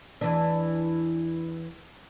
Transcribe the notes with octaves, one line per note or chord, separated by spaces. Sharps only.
E2 E3 D4